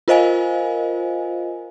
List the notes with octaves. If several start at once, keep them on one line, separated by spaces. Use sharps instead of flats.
F4 A#4 C5 D#5 F5 G#5